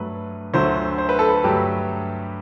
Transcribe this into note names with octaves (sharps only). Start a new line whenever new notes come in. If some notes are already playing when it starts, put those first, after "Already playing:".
Already playing: G2 F#3 A3 B4
D2 D3 F#3 A3 C5
C5
B4
A4
B4
G2 F#3 A3 G4